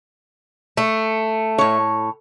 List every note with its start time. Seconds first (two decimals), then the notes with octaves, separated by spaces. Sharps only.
0.77 A3
1.58 A2 C#5